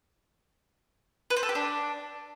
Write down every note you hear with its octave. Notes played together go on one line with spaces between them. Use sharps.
B4
C5
A4
G4
D4